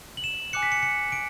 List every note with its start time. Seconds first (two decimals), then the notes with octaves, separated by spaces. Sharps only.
0.17 F#7
0.24 E7
0.53 G#5 D6 F#6 C#7
0.63 B6
0.72 C#7
0.83 C#7
1.12 D7